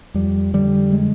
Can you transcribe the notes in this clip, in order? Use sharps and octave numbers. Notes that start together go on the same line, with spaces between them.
F2 G3
D3 G3
G#3